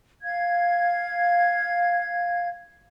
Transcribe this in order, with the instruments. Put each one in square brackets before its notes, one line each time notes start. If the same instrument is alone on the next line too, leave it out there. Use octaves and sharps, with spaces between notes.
[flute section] F5 G#6